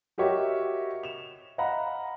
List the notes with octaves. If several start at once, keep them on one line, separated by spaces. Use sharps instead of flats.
F#4 G4 A#4 C#5 D#5 E5
E7 F7
D#5 F5 F#5 A#5 B5